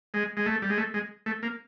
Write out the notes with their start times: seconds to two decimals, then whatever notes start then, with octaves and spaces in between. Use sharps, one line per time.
0.14 G#3
0.37 G#3
0.46 A3
0.62 G3
0.70 G#3
0.78 A3
0.94 G#3
1.26 A3
1.43 A#3